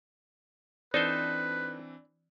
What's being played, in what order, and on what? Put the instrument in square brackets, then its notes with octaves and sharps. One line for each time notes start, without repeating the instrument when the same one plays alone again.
[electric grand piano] E3 C4 D4 [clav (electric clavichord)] D#4 A4 C5 [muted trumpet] B4 [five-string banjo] D5